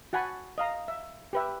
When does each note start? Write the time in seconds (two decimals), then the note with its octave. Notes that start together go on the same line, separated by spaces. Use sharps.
0.13 F#4 F#5 G#5 A5 B5
0.58 D#5 F5 A#5
0.88 E5
1.33 G4 B4 E5